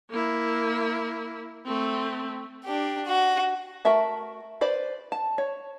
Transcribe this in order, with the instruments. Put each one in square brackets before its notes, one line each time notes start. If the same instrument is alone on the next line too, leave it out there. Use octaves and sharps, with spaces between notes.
[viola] A#3 E4
A3 C4
[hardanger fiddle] D4 G4
F#4
[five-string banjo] A3 F#4 A#4 E5 A5
B4 C5 D5
A5
C#5